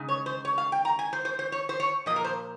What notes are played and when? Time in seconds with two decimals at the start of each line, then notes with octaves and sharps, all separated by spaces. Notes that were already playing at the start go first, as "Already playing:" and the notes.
Already playing: C#3 G#3 D#4
0.08 C#5
0.26 C5
0.45 C#5
0.58 F5
0.72 G5
0.85 A#5
0.99 G#5
1.13 C5
1.25 C5
1.39 C5
1.52 C#5
1.69 C5
1.80 C#5
2.06 A#2 F3 A#3 D#5
2.16 A#4
2.24 C5